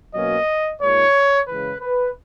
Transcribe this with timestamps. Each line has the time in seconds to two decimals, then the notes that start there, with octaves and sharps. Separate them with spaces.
0.14 B2 F#3 A#3 C#4 D#5
0.81 A#2 G#3 D#4 C#5
1.48 C#3 E3 G#3 B4
1.81 B4